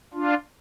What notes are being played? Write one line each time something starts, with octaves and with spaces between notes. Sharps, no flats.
D4 F4